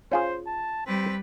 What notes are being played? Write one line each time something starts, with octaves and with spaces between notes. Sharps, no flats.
C#4 F4 G#4 C5
A5
G3 C4 B4